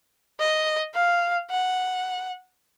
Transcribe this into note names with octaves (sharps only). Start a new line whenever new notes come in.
D#5
F5
F#5